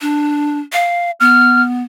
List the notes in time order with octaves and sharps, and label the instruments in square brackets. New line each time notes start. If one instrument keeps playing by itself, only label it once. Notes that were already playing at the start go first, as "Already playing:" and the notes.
[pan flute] D4
F5
[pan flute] B3 [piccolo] F6